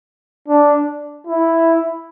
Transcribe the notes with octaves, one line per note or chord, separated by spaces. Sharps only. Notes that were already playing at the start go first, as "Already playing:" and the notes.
D4
E4